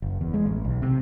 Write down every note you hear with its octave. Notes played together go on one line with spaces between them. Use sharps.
F#1
E2
G#3
A1
B1
C3